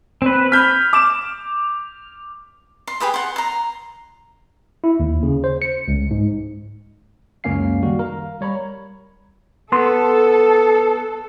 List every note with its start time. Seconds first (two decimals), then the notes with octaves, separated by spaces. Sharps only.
0.22 C4 B4
0.52 B5 F6 G6 B6
0.93 D6 E7
2.87 C6
3.00 G4 G#4 B4 D#6
3.14 F#5 C6
3.36 A#5 C6
4.84 E4
5.00 D#2
5.23 C#3
5.44 C5
5.62 C#7
5.88 C#2
6.11 G#2
7.44 C#2 F#2 A#3 C#4 F5 C7
7.83 D#3 G3 F#4
7.99 A#4 F5 A#5
8.41 G3 C#5 A#5 B5
9.72 B3 A4 C6